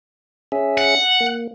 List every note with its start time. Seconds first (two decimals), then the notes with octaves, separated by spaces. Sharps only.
0.52 C#4 G#4 E5
0.78 F#5
1.20 A#3